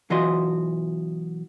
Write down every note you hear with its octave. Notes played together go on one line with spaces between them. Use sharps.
B1 E3 F4 F#4 D#5 C6